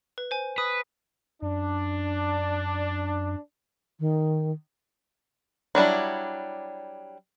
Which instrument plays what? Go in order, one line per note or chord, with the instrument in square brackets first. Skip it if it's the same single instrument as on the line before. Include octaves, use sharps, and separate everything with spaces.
[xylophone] B4
C5 G#5
[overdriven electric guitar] B4 [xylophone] D#6
[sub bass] F#2 [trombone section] D4
[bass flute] D#3
[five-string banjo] F#3 G3 D4 E4